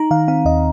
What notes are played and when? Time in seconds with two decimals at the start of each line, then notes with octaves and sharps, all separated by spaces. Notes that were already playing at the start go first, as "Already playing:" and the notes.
Already playing: D#4 A#5
0.11 D#3 F5
0.28 C4 F5
0.45 D#2 D#5